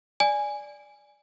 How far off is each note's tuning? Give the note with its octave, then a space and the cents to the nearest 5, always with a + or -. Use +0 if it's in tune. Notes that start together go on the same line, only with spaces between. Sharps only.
D5 +0 G#5 +0